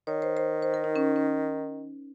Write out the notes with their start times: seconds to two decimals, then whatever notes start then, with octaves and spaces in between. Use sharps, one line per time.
0.07 D#3 C#5
0.22 C5
0.37 C5
0.62 C5
0.74 A#4
0.84 D#4
0.96 C#4
1.16 C#4